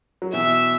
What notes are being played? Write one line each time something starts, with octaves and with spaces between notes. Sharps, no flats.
F#3
B2 E3 E5